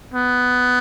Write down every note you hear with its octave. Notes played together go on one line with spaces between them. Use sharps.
B3